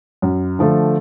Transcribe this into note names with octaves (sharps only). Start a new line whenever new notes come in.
F#2
D3 F3 A3